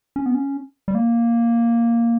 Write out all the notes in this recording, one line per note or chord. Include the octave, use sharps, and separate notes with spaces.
C#4
B3
C#4
G3
A#3